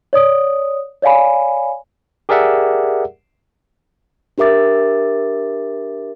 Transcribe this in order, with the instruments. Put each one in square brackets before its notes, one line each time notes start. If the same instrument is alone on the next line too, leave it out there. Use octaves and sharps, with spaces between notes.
[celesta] C#5 D5 D#6
C#5 D5 F5 G#5 B5
[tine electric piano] G4 G#4 A#4 D5 E5 F#5
[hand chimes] D4 G4 A#4 E5 D6 A6